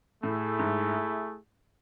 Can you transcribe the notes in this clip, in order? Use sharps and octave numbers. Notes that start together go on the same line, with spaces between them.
A2 A3 E4 G#4
G#2